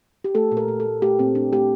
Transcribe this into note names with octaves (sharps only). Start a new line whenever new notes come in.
G4
A3 A4
A#2
A#4
A#2
A4
A3
A3 G4
A#2 C4
A#2 D4
A3 G4